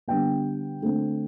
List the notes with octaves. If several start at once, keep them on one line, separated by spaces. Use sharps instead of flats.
D3 G3 B3 G5
D3 A3 C4